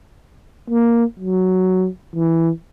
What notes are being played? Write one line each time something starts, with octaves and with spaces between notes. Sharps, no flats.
A#3
F#3
E3